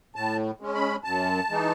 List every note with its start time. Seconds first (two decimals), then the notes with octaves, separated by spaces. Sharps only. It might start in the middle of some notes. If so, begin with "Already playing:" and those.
0.16 A2 A5
0.61 G#3 C#4
0.75 B5
1.04 F#2 A5
1.49 E3 G#3 D#4